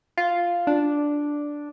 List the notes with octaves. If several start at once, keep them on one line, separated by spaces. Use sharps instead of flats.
F4
D4